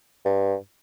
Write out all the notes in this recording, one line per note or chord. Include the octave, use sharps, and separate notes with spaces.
G2